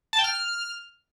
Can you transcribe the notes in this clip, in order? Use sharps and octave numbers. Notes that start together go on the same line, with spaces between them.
A5
G5
F6